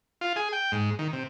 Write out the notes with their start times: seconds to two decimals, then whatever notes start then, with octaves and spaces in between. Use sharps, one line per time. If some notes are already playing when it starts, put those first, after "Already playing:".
0.21 F4
0.36 G#4
0.53 G5
0.72 G#2
0.99 D#3
1.13 C3